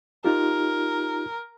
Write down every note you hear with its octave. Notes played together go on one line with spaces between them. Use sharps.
D#4 F4 G4 A#4